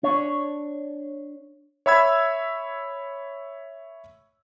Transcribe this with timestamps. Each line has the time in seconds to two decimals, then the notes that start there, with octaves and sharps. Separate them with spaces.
0.03 D4 C#5
1.86 C#5 E5 B5 E6 G#6